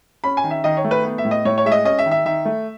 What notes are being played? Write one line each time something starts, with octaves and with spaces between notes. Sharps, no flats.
C#4 B5
G#5
D#3
E5
D#3 D#5
C#5
A3
B4
B3
E5
A2
D#5
A2 C#5
C#5
G#3 E5
D#5
C#4 D#5
E5
D#3
E5
D#3 E5
A3